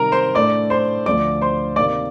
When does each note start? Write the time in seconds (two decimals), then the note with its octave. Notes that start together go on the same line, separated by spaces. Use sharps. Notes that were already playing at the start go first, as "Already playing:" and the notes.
Already playing: C3 D#3 G3 A#4 A#5
0.12 C5 C6
0.35 A2 A3 D4 D5 D6
0.70 C5 C6
1.06 D2 D3 F3 D5 D6
1.41 C5 C6
1.76 C3 D#3 A#3 D5 D6